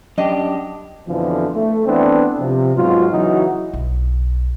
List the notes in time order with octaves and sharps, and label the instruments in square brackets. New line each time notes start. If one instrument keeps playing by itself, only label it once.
[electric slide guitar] F#2 D4 G4 [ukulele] D#5
[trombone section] F2 B2 D3 E3 F3
A3
E3 A3 B3 C4 D4
C3 F3
G#2 B2 F#3 F4
C#3 E3 F#3 D#4 E4 F#4
[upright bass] B1